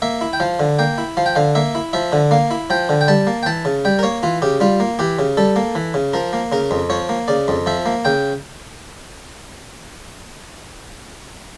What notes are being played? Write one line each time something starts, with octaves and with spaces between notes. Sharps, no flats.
A#3 E5
E4
G5
F3 F5
D3
A#3 G5
E4
F3 F5
G5
D3 F5
A#3 E5
E4
F3 E5
D3
A#3 F5
E4
F3 G5
D3
G5
G3 A5
A#3
G5
E3 A5
C#3
G3 G5
A#4
A#3 C#5
E3 F4
C#3 G4
G3 F4
A#3
E3 G4
C#3
G3 A4
A#3
E3
C#3
F3 A#4
A#3
C#3 A#4
F2
F3 C#5
A#3
C#3 D5
F2
F3 E5
A#3
C#3 G5